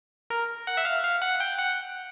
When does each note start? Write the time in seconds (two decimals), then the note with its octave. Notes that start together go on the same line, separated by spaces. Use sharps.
0.30 A#4
0.67 F#5
0.77 E5
0.85 F5
1.03 F5
1.22 F#5
1.40 G5
1.59 F#5